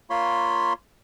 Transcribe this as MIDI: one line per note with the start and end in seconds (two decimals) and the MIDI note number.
0.10 0.73 58
0.10 0.73 65
0.10 0.73 73
0.10 0.73 83
0.10 0.73 84